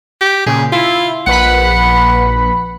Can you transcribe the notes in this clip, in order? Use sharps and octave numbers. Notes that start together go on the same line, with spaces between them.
G4
A#2 C#3 G#4
E4 F4
A#1 B4 F#5 B5